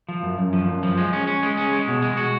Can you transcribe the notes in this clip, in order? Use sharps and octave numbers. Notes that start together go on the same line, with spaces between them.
F3
F#2
F#2
F3
F#2
F3
G#3
C#4
C#4
G#3
C#4
G#3
B2
G#3
F#4